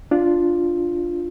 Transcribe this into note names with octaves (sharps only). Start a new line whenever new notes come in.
D4 F4